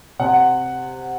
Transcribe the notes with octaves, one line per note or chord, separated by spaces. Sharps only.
C3 F#5